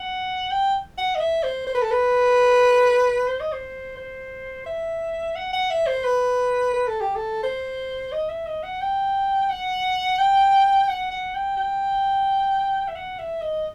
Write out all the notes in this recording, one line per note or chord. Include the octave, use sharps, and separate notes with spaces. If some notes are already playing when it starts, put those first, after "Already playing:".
Already playing: F#5
G5
F#5
D#5
E5
C5
C5
B4
A4
B4
C5
D#5
C5
C5
E5
F#5
F#5
E5
C5
B4
B4
A4
G4
A4
C5
D#5
E5
D#5
F#5
G5
F#5
G5
F#5
F#5
G5
G5
E5
F#5
E5
D#5